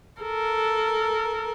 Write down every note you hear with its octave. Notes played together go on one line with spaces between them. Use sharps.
A4 A#4